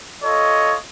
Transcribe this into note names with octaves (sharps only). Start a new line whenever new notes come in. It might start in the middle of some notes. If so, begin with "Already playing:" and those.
F4 A4 C#5 D#5